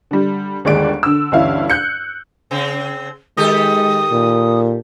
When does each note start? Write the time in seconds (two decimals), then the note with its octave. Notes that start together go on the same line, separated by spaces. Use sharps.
0.11 D3 G3
0.65 G1 D#2 G#3 D5 D7
1.03 D3 E6
1.32 D2 G2 E3 C#4 E4 F5
1.70 F#6 G6 C#7
2.51 C#3 C4
3.37 D#3 G#3 G4 A4 D#6
4.11 A#2